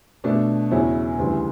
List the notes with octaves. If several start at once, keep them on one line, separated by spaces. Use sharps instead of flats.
B2 A3 D4
E2 C#3 F#3 C#4 E4
D2 C#3 E3 G3